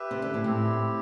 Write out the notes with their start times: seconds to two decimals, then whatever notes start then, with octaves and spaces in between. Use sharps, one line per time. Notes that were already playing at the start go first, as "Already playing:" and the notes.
Already playing: G4 B4 E5
0.11 C3
0.22 D3
0.34 A2
0.44 A2 C4 E4 G4